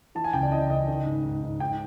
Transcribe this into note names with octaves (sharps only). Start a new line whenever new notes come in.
E3 A5
G#5
C#2 G5
D5
E3 D#5
C#2 D#5
D#3
G#2
G#2
G#2
G#2 G5